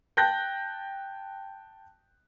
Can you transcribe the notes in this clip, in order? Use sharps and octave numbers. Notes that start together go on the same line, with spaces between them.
G5 A5 F#6 G6 A#6